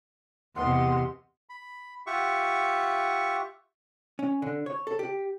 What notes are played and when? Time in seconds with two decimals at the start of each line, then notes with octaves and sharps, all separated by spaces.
0.56 E2 C3 B4 D#5 F#5 C6
1.49 B5
2.07 F4 G4 E5 F#5 C#6
4.19 C#4
4.42 D3
4.66 C#5
4.87 A4
4.99 G4